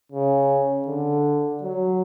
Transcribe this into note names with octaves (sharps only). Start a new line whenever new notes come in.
C#3
D3
F#3